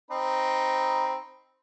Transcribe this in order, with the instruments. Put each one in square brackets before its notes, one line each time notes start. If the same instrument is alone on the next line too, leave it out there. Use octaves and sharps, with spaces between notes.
[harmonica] C4 D#4 B5